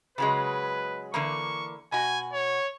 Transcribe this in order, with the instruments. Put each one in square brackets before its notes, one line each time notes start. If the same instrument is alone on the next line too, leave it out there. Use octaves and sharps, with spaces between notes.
[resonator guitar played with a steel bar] C#3 F#3 G#3 [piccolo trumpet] B4
[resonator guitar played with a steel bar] D3 E3 A#3 [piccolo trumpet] C#6
[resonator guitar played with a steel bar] B2 F#4 [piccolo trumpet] G#5
[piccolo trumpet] C#5